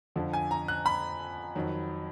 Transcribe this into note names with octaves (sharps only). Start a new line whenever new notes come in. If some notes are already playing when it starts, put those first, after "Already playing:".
F2 D3 F3
G#5
A#5
F#6
B5
F2 D#3 F#3